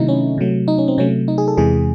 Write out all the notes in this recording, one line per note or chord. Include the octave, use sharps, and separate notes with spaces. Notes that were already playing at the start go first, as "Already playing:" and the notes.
Already playing: C3 D#3 F#3 A3 D#4 E4
C#4
C3 F#3 A3
D#4
C#4
C4
C3 F#3 A3 C#4
D#4
G#4
A4
E2 C3 E3 G#3 G#4